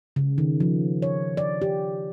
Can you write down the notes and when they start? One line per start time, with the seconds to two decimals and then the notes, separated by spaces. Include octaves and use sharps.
0.16 C#3
0.38 D#3
0.60 F3
1.02 C#5
1.37 D5
1.62 G4